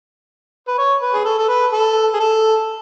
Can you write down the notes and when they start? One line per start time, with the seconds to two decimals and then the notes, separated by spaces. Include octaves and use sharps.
0.68 B4
0.78 C#5
1.02 B4
1.14 G#4
1.25 A4
1.38 A4
1.49 B4
1.73 A4
2.14 G#4
2.20 A4